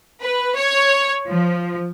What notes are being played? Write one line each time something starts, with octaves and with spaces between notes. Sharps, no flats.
B4
C#5
F3